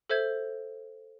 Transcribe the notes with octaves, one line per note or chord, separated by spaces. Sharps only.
A4 C5 E5 G6 G#6